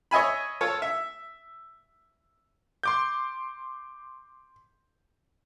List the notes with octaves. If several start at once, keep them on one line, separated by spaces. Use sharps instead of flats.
C#5 D#5 E5 G#5 B5
F4 A4 C#5
E5
C6 D6 G6